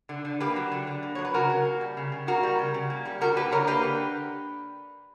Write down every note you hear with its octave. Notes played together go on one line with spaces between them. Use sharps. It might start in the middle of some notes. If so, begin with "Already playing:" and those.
D3
D3
A#3 G4 B4
F#3
D3
D3
A#3
F#3 C#5
B4
C#3 F#4 A#4
C#3
A#3
G3
C#3
C#3
A#3 F#4 A#4
G3
C#3
C#3
A#3
G3
D3 F#4 A#4
A#3 G4 B4
D3 A#4 C#5
A#3 G4 B4
D3